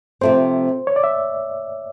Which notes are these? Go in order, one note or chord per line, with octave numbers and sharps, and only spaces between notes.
C3 F3 A3 C4 C5
C#5
D5
E5